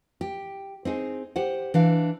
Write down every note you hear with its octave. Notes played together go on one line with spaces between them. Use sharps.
G4
C4 D#4 G#4
G4 C5 F#5
E3 D4 F5